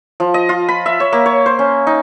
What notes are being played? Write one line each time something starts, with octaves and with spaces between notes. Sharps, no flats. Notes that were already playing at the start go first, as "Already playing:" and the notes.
F3
D#5
F4
B5
E5
C#5
A#3
C#5
C5
C#4
D#4